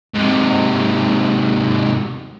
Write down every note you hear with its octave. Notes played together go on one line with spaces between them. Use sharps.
G#2 C3